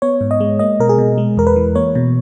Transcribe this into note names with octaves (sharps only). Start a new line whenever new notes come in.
B3 C#5
G#2
D#5
G#3
A#3 D#5
B2 A#4
G#4
B2
G#3
E2 A#4
B4
E3
A#3 C#5
B2